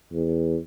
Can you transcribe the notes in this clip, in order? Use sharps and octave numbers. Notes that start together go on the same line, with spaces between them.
E2